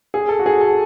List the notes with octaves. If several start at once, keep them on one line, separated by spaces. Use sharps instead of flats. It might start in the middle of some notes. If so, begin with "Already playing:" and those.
G#4
A4
F#4
G#4
A4